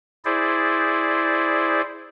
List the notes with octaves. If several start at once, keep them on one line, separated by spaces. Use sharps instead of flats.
E4 G#4 C5 D5